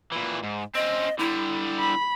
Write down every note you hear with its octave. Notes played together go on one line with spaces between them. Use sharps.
A#2 E3
G#2
C4 C#4 D#5
D3 G3 E4
B5